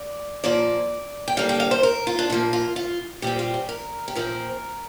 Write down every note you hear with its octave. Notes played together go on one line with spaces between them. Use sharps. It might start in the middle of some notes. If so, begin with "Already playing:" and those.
Already playing: D5
A#2 F3 A#3 D5
G5
D3 G3 A#3 F5
G5
F5
C5
A#4
F4
D4
A#2 F3 A#3 F4
F4
F4
A#2 G3 C4 G4
F4
G4
A#4
G4
A#2 F3 C4 A#4